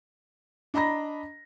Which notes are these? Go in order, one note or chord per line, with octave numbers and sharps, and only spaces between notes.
D4 D#5 A#5 B5 A#6